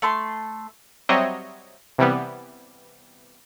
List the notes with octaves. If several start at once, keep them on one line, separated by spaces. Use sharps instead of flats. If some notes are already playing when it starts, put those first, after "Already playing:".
A3 A5 C6
F#3 G3 C4 C#5 D#5 E5
C3 E3 G3 B3